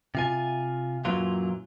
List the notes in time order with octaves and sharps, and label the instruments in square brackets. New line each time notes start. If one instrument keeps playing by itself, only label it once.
[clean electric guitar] C3 F4 G#5
F#2 A#2 E3 F#3 F4